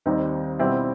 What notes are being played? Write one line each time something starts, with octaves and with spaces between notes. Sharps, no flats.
D#2 D#3 G3 C4 D#4
B2 G3 C4 E4